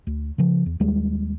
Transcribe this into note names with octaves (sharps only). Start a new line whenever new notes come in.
D2
C#3 F3
E2
D#2 G3 G#3